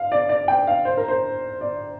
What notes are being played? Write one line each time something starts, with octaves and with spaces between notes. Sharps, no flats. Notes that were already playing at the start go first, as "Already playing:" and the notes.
Already playing: F5
D5
D5
G5
F5
C5
A#4
C5
D5